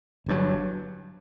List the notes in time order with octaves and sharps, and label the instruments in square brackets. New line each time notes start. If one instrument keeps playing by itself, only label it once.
[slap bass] G1 G2 F#3